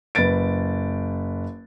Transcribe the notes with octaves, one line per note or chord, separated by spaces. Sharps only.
F#1 B4 A6 D7